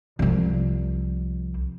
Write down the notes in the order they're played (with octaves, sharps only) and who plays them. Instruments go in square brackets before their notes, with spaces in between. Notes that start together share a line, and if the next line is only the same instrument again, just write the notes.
[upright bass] C2 F3